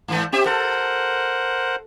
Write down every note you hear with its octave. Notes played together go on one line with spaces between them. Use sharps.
G#2 E3 A3
C4 G4 E5
A4 A#4 C5 F#5